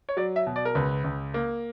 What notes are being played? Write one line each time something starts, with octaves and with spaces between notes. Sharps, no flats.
C#5
F#3 D5
E5
B2
D5
A#4
C#2 B4
C#2
A#3